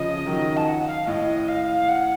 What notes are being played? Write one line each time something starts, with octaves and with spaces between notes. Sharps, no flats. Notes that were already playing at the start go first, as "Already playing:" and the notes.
Already playing: C#3 F3 D#5
D#3 F#3
A5
F#5
F#5
F5
A2 D#5
F5
F#5